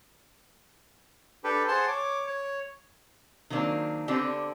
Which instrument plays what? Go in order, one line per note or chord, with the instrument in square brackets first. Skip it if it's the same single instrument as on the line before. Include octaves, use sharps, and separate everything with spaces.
[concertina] D4 G4 A4 B4
G#4 C5 F#5 A5 C6
C#5 D6
C#5
[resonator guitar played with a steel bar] D#3 F#3 A#3 C4 D4
D3 B3 C4 D4 G4 C5